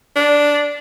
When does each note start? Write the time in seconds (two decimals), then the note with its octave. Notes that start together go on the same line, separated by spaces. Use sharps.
0.16 D4